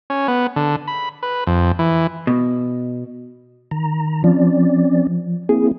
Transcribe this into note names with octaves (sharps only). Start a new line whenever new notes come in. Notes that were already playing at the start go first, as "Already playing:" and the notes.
C#4
B3
D3
B5
B4
F2
E3
B2
D#3 A#5
F3 C4 C#4 D5
A#3 C4 E4 G#4